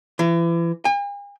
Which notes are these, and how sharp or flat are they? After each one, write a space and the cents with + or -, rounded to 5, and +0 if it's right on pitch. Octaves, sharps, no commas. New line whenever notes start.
E3 +35
G#5 -45